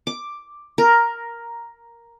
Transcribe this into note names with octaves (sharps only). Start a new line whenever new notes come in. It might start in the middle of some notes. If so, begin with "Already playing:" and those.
D6
A#4